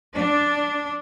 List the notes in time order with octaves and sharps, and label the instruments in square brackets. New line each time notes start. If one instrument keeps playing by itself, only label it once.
[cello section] D4